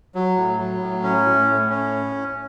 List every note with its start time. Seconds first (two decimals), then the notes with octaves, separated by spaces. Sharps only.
0.15 F#3
0.37 A2
0.59 F#3
0.81 A2
1.04 C#4
1.26 A2
1.48 A2
1.70 C#4